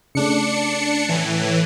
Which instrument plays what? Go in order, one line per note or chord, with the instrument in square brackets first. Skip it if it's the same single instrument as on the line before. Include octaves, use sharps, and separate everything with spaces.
[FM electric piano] C#3 A3 [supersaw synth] D4 C#7
[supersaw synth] A2 E3